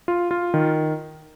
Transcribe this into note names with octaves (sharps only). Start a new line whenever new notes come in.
F4
F4
D#3